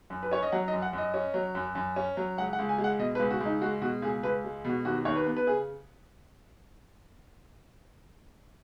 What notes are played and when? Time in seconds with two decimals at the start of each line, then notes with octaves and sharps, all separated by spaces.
0.10 F#2
0.23 B4
0.31 C#4 C#5
0.43 D#5
0.52 F#3 F#5
0.68 D#5
0.73 F#2
0.82 F#5
0.93 F#2 D#5
1.14 C#4
1.34 F#3
1.55 F#2
1.75 F#2
1.96 C#4
2.17 F#3
2.37 C#2 F#5
2.53 F#5
2.59 C#2
2.69 G#5
2.78 G#3
2.84 F#5
2.99 B2 D#5
3.15 B4
3.20 C#2
3.31 F#4
3.40 C#2
3.46 D#4
3.62 G#3 F#4
3.81 B2 F#4
4.02 C#2 G#4
4.23 C#2 B4
4.45 G#3
4.65 B2 F#4
4.85 D#2 F#4
5.05 D#2 C#5
5.16 B4
5.26 B3
5.37 B4
5.47 C#3 G#4